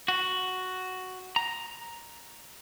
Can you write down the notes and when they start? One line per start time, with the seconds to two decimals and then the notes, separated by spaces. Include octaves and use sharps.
0.08 F#4
1.36 A#5